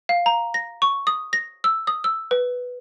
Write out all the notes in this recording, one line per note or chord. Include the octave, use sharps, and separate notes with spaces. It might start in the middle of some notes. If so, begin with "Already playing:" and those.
F5
A#5
A#6
C#6
D#6
A#6
E6
D#6
E6
B4